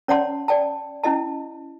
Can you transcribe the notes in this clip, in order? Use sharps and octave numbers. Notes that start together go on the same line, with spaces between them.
C#4 C#5 D5 F#5 A5 C6
D5 G5 A5
C#4 E4 D#5 A5